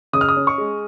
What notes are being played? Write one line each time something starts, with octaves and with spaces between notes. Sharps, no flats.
C#3 D#6
F6
D#6
C#4
C#6
G#3